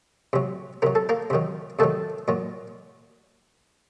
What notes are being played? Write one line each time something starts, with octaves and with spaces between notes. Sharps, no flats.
C3 F#3
C3 F#3 A#4
A4
A#3 A#4
C3 D#3 F#3
C3 D#3 F#3 A3 A4
A#2 F#3